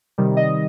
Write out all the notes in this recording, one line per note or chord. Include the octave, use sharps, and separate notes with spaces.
C3 D#3 G3
D#5